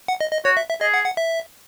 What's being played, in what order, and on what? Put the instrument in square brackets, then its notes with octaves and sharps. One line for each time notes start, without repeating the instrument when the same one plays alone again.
[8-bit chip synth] F#5
D#5
D#5
[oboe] F#4 [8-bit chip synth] C#5
[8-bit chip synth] E5
E5
[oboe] G#4 [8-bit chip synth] D#5
[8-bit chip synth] F#5
F#5
E5